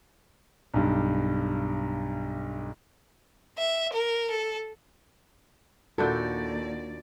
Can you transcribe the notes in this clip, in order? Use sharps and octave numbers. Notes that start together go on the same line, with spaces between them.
B1 G2
E5
A#4
A4
D#2 A#2 D4 E4 F#4 A4 D5 G6